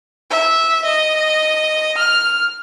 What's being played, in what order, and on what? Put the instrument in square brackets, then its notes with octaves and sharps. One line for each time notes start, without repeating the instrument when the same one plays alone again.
[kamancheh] E5
D#5
F6